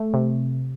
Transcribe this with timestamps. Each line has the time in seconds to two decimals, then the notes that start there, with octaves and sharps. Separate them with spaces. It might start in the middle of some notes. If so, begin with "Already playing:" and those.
Already playing: A3
0.14 C3